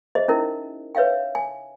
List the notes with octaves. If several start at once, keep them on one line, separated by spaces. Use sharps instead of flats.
G#4 C5 D#5 E5
C#4 D#4 E4 A#4
B4 C#5 E5 F5 G5
G#5